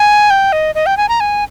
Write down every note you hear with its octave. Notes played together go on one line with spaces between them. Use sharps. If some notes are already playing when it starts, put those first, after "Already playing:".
Already playing: G#5
G5
D#5
D#5
G5
G#5
A#5
G#5